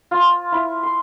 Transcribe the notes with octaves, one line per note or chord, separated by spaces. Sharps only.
F4
E4
C6